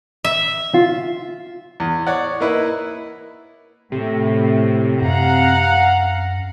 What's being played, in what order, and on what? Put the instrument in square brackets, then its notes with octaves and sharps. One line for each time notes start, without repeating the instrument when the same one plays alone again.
[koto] E5
[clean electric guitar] F4
[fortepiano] E2
C#5 D5 F#5
A#3 D#4 E4 B4
[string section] A2 [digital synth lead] C3
[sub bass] F#2 [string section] F5 F#5 A#5